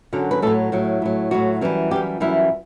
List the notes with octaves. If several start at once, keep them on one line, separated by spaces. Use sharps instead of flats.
F#2 D3 F#3
B4
A2 F#3 A4
A2 F#3
A2 F#3
A2 F#3 F#4
F#2 E3 G3
F#2 E3 G3 G4
F#2 E3 G3 E4